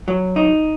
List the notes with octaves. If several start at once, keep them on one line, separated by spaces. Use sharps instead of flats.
F#3
D#4